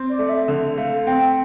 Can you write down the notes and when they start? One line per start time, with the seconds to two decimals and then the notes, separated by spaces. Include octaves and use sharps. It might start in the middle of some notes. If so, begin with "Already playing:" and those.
Already playing: C4
0.10 D5
0.19 A3
0.29 E5
0.48 D3
0.77 A3 F5
1.07 C4 G5